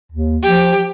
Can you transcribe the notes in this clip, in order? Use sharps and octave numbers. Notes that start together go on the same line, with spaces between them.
D#2
F3 G4